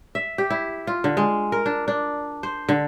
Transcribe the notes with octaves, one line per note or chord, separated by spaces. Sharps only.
E5
G4
E4
F4
D3
G#3
A#4
D4
D4
C5
D3